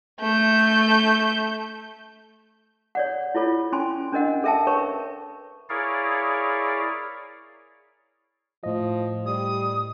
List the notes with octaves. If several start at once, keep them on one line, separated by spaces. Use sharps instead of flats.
A3 G6
C#5 D5 F#5
E4 F4 A4 C#5
C#4 G#5 C6
C#4 D4 A#4 D#5 F#5
A4 A#4 E5 G5 A5
A#4 B4 C#5 C#6
E4 G#4 A#4 C#5 D5 F5
A2 F3 D#5
G3 D#6